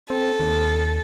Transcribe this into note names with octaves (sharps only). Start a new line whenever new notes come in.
C4 A4
D#2